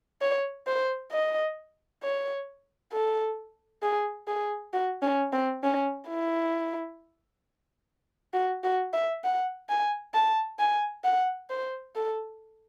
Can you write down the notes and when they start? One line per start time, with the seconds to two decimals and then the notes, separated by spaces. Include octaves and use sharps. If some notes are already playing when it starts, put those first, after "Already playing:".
0.21 C#5
0.67 C5
1.11 D#5
2.03 C#5
2.92 A4
3.83 G#4
4.28 G#4
4.73 F#4
5.02 C#4
5.33 C4
5.63 C#4
6.08 E4
8.34 F#4
8.64 F#4
8.93 E5
9.24 F#5
9.69 G#5
10.14 A5
10.59 G#5
11.04 F#5
11.50 C5
11.95 A4